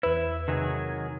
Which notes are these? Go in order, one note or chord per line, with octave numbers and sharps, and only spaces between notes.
E2 E4 B4
C3 D#3 F#3 G#4